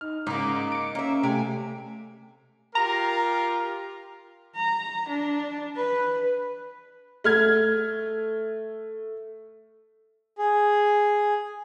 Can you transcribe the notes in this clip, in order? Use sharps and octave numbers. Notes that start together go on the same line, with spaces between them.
D#4 F6
G#2 C#3 A#3 D#4 D6
C#7 D7
A#3 C#4 E5
C3 A3 G5 G#5
F4 G4 A#4 A#5
A#5
D4
B4
A3 F6 G#6
G#4